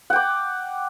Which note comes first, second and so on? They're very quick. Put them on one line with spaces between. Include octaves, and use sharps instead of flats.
F#5 G5 D6